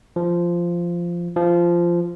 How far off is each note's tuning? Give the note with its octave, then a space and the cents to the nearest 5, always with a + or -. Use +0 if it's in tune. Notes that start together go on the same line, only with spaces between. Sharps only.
F3 -10
F3 -15